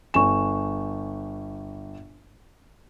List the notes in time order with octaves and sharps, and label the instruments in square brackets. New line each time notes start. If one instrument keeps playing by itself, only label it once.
[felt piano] G1 E7 [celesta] G#5 C#6